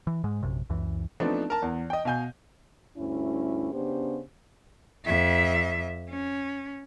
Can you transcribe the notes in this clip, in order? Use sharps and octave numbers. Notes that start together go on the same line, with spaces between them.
E3
G#2 G#3
A#1 F#2 C3
C#2 F#2 E3
F3 A3 B3 C4 D4 D#4
A#4 A5
E2
D#5 G5
B2 F5 G#5 G6
D2 G2 C#4 E4
C#3 B3 D4 G4 C5
F2 E5
C#4